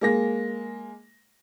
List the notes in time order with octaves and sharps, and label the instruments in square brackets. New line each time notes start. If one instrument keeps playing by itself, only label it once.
[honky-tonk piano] G#3 A#3 A#6